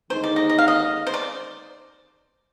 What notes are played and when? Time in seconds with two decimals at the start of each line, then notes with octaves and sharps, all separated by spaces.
0.10 D#2 D3 G#3 D#4 C5
0.24 D5
0.36 D#5
0.50 D#5
0.58 F5
0.68 D#5
1.07 C5
1.14 D5